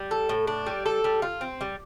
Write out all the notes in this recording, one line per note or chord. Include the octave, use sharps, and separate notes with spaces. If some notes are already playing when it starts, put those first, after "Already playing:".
Already playing: G3
A4
A2
D4
G3
A4
G3
F4
C4
G3